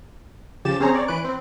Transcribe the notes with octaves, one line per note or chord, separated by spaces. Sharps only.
C#3 F3 G4 A6 E7
C4 C#4 G#4 C5 C#5 A#5
C#5 D5
E3 B4 F#6 D7
C4